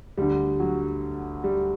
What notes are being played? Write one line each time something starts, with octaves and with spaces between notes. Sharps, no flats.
D2 D3 G3
F#3
G3